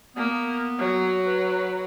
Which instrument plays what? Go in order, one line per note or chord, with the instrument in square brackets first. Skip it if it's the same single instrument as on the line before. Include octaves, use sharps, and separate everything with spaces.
[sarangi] A#3 [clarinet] B3
[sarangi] F#3
[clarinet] B4